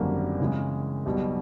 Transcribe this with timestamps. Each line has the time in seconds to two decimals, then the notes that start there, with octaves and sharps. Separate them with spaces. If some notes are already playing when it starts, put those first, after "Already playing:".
Already playing: G#1 F#2 D3 G3 A#3
0.40 C#3 E3 G#3
1.06 B1 B2 G3